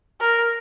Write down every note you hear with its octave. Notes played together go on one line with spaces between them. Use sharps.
A#4